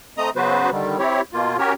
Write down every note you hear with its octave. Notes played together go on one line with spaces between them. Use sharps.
A3 C4 D#5 A#5 D#6
C#3 F#3 B3 F#4 B4 C5
D3 D#3 G3
C4 E4 G4 C#5
B2 A#3 F4
C#4 F#4 G4 A#4 C#5